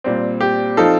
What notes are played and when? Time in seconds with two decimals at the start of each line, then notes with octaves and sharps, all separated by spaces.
0.04 A#2 G3 C4
0.41 G4
0.77 F3 C4 D#4 F4 A4